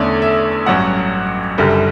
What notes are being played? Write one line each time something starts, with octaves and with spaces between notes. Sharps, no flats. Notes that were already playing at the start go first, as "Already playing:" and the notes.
Already playing: E2 D3 A3 C#4 D5
E5
A1 G2 F#3 C#4 F#5
F#1 F#2 D3 G3